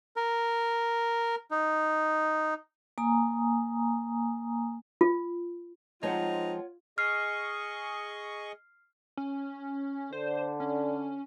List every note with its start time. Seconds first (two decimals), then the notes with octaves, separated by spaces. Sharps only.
0.16 A#4
1.51 D#4
2.98 A#3 G#5 A#5 D#6
5.01 F4
6.03 F3 G#3 C4 D#4 F4 C#5 F#5
6.98 G#4 D#5 C#6 F6 C7
9.17 C#4
10.13 D3 C5
10.60 C#4